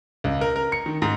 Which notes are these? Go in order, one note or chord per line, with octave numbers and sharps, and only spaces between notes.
C#2
A#4
A#4
C#7
D#3
G#2